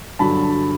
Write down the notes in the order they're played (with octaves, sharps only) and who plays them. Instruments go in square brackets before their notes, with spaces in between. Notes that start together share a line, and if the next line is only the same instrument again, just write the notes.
[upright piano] G2 D3 F#3 A5 B5